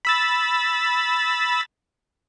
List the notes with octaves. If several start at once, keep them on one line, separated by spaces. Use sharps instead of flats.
B5 E6 A6